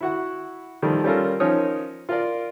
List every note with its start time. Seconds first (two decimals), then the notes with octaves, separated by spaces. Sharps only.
0.01 E4 F#4 F#5
0.82 D#3 F3 G3 A3
1.04 G3 C#4 F4 A4 A#4
1.40 F3 C#4 D#4 A#4 C#5 D#6
2.09 F4 A#4 D5